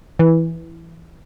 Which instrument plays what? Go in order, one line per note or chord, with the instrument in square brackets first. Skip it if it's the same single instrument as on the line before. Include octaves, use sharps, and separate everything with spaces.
[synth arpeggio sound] E3